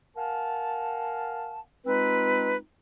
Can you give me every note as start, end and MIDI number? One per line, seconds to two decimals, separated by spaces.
0.16 1.60 70
0.16 1.60 77
0.16 1.60 78
0.16 1.60 80
0.16 1.60 81
1.86 2.57 56
1.86 2.57 60
1.86 2.57 63
1.86 2.57 65
1.86 2.57 71